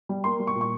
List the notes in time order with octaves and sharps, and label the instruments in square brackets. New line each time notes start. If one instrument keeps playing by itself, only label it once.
[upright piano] G3
A#3 C6
G3
C#6
A#2
C#6